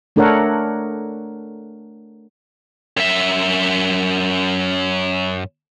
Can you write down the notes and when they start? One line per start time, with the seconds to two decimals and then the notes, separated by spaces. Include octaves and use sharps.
0.16 A3 D4 A4 A#4 C#5 F#5
2.97 F#2 E5